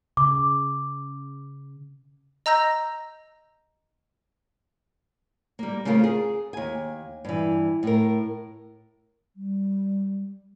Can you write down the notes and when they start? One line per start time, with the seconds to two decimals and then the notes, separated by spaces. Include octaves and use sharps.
0.17 C#3 D6
2.46 D#5 A#5 E6 G6 A#6
5.59 G3 A#3
5.85 C#3 A3 C4 C#4 F4 A#4
6.04 G#4
6.53 D#2 G#5
7.25 G2 E3
7.83 A2 A#4
9.36 G3